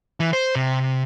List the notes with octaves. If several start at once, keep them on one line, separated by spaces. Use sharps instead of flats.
E3
C5
C3